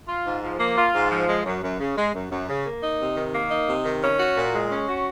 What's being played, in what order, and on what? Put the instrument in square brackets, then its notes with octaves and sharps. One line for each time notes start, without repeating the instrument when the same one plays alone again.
[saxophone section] F4
G#2
F3
A#3
F4
G#2
F3
G#3
F#2
F#2
C#3
G#3
F#2
F#2
C#3
A#3
D#4
C3
D#3
A#3
D#4
C3
D#3
C#4
F#4
A#2
G#3
C#4
F#4